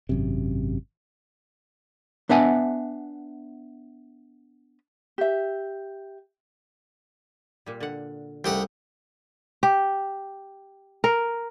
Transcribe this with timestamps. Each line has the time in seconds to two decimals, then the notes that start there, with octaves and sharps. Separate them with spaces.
0.09 G#1 F#2 C3
2.29 B3 D4 E5 F#5 G#5
5.18 G4 E5
7.66 A#2 G3
7.80 D3 F#5
8.44 C2 C#3 A3 G4 F#5 G5
9.63 G4
11.04 A#4